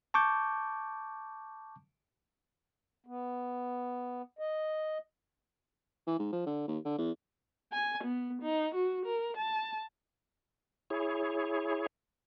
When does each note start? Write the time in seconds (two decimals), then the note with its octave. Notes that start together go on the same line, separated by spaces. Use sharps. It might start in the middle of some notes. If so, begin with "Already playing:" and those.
0.14 A5 C#6 D6 G6
3.06 B3
4.39 D#5
6.07 E3
6.19 G#2
6.33 F3
6.46 D3
6.68 D#2
6.85 D3
6.98 E2
7.72 G#5
8.04 B3
8.42 D#4
8.75 F#4
9.06 A#4
9.37 A5
10.90 E4 G#4 C#5